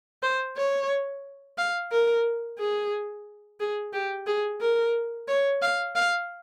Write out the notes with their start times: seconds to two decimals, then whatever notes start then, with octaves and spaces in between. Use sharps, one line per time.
0.23 C5
0.57 C#5
1.58 F5
1.92 A#4
2.58 G#4
3.60 G#4
3.93 G4
4.27 G#4
4.61 A#4
5.28 C#5
5.62 F5
5.95 F5